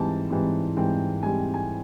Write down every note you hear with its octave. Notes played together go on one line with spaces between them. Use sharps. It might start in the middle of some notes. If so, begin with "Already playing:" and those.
Already playing: G#2 E3 G3 C4 A5
G#2 E3 G3 C4
G#2 E3 G3 C4 G5
G#2 E3 G3 C4 G#5
G#5